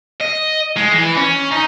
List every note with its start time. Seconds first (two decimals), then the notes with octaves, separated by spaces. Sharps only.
0.21 D#5
0.76 G#3
0.92 E3
1.17 C#4
1.51 D#4